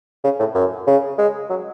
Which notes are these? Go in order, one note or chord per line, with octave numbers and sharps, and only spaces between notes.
C#3
A2
F#2
C#3
G#3
F#3